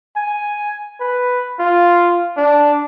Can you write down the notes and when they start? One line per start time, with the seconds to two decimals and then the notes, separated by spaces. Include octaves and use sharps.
0.17 G#5
1.00 B4
1.60 F4
2.37 D4